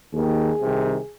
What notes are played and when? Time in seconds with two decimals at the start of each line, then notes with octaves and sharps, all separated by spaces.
0.13 D#2 D#3 G#4
0.60 C2 C3 D#3